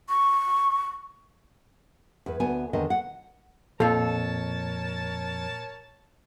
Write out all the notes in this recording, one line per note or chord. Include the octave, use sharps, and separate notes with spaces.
C#6
E2 B4
D2 B3 G#5
E2 D3 D#3 D#5
F#5
F2 A#2 A4 A#4 C#5 F5 A5